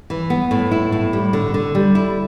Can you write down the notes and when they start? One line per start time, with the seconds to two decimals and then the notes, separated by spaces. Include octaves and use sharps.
0.10 E3
0.30 B3
0.51 A2
0.71 E4
0.92 A2
1.13 G3
1.33 D3
1.54 D3
1.75 G3
1.95 E4